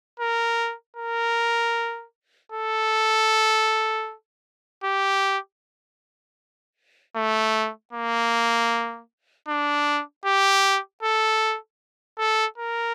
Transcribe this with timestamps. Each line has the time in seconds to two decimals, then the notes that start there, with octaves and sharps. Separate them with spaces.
0.20 A#4
0.97 A#4
2.52 A4
4.84 G4
7.16 A3
7.93 A#3
9.48 D4
10.25 G4
11.03 A4
12.19 A4
12.58 A#4